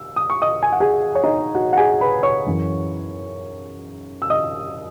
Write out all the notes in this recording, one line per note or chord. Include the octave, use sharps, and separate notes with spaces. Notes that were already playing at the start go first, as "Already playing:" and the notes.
Already playing: E6
D#6
C#6
D#5 D#6
G#5
F#5
G#4 G#5
C#5
D#4 D#5
F#4 F#5
F#5
G#4 G#5
B4 B5
C#5 C#6
F#2 E3
E6
D#5 D#6